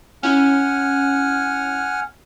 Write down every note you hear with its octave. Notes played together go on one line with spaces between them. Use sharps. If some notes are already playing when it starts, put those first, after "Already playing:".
C#4 E4 F#5 G#5 F6